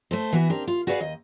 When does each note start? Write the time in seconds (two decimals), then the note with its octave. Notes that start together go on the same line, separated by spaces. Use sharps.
0.11 A3 A4 C5
0.33 E3 B3 F#4
0.50 C4 D4 G4 A#4
0.67 F4
0.87 F#4 G#4 B4 D5 E5 F5
1.00 D#2 D#5